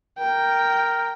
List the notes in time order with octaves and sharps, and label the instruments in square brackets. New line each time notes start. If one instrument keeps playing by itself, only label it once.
[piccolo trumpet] A#4 [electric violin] G5